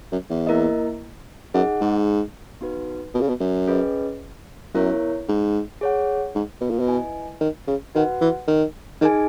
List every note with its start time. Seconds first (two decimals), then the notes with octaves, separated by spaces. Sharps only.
0.12 F#2
0.30 E2
0.47 A#3 E4 A#4 D#5
1.54 F#2 D#4 G#4 D#5 F#5
1.81 G#2
2.61 B3 D#4 F#4 B4
3.14 B2
3.21 C#3
3.28 B2
3.40 F#2
3.68 C#4 G#4 B4 D#5
4.74 F#2 B3 E4 A#4 C#5
5.28 G#2
5.81 G#4 C#5 F#5
6.35 G#2
6.61 B2
6.70 A#2
6.79 B2
6.88 E4 B4 D#5 G#5
7.40 D#3
7.67 C#3
7.95 D#3 F#4 B4 F#5
8.21 E3
8.47 D#3
9.01 D#3 D#4 G#4 D#5 G#5